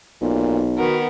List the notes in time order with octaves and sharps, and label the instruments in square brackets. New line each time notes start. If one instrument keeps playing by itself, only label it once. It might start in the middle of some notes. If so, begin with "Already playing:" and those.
[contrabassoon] B1 [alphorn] A#2
[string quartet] D#3 B3 A#4 [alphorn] F#4